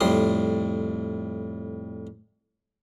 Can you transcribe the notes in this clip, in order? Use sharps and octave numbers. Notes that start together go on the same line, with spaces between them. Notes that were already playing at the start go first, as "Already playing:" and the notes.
F2 A2 G3 C6 D#6